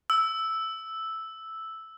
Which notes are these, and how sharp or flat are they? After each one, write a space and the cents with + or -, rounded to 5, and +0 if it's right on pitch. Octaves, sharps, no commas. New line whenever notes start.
E6 -5